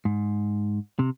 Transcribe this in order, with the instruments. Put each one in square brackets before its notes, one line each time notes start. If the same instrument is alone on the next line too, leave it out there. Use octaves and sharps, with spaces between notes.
[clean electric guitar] G#2
C3